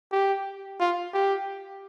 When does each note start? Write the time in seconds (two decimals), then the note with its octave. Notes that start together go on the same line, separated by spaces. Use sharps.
0.12 G4
0.80 F4
1.14 G4